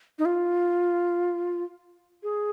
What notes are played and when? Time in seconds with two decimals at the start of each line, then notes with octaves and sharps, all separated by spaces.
0.19 D#4
0.25 F4
2.23 G#4